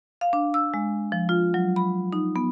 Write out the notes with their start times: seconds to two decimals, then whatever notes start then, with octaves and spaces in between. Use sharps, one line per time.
0.21 F5
0.33 D4
0.54 E6
0.74 G#3
1.12 F3
1.29 F4
1.54 F#3
1.76 B5
2.12 D#4
2.36 B3